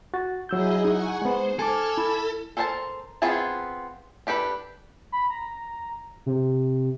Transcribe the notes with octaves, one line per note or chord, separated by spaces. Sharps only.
F#4 A6
F#3 E4 G#4 D#5 E6 G6
D#4 F#5 G#5 C#6
G#3 B3 C5
A4 G#5 A5 D6 F6 G#6
E4 B5
A4 A#4 C5 E5 A5
B3 C4 F4 G#4 A5
D4 G4 A4 B4
B5
A#5
C3